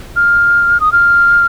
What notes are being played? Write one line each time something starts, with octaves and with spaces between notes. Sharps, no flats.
F6
D#6
F6